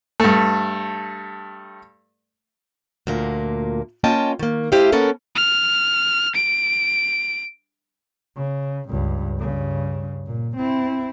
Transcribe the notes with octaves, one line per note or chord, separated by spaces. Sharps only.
G2 A3
D2 A#2 A#3
A#3 C#4 F4 D#5 G5 A5
D#3 A#3
A3 E4 G4 C5 D#5 F5
A#3 B3 C#4 A4 A#4
F6
D7
C#3
C#2 G2
G2 C#3
A#2
C4 E4